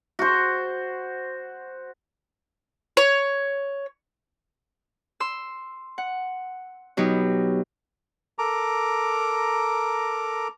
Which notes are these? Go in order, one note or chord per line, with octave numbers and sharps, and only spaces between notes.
F#4 C5
C#5
C6 E6
F#5
B2 F#3 D#4 G4
A4 A#4 A#5 D6